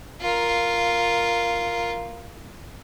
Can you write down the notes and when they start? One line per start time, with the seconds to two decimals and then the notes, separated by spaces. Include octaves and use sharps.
0.21 F4 A#4